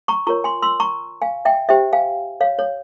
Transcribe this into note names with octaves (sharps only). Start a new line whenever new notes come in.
A#5 C#6
F4 A#4 C#5 A#5 C#6
G#5 C6
C6 E6
A#5 C#6
F5 G#5
E5 G5
G4 C5 E5 G5
F5 G#5
C#5 F5
C#5